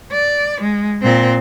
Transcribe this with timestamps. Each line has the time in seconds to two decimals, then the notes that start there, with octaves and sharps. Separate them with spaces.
0.13 D5
0.61 G#3
1.03 A#2 C4